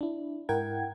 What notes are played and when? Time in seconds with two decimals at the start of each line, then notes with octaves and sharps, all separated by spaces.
0.01 D4 E4
0.49 G#2 E4 A#4 F#5 G5 G#6